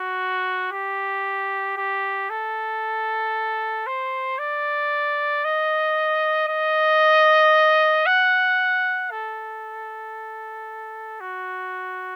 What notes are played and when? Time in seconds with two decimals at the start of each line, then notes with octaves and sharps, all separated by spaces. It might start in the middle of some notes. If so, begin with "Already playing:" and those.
Already playing: F#4
0.72 G4
1.77 G4
2.30 A4
3.87 C5
4.39 D5
5.44 D#5
6.49 D#5
8.06 F#5
9.11 A4
11.20 F#4